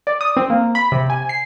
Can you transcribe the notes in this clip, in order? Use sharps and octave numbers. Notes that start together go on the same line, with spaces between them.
D5
D#6
C4
A#3
B5
C3
G#5
C7